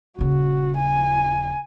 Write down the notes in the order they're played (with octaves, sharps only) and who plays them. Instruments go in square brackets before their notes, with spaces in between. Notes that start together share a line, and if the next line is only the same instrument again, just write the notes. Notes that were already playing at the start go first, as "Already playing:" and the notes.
[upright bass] D#1 C#3 [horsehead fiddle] F#4
[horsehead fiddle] G#5